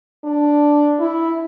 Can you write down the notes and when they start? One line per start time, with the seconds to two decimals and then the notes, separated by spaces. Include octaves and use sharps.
0.24 D4
1.00 E4